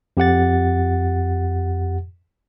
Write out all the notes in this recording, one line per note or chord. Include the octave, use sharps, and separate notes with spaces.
F2 G4 F#5 A6